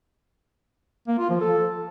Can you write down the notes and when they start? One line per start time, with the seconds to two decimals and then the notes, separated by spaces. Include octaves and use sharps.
1.08 A#3
1.19 F4
1.30 F3
1.41 A4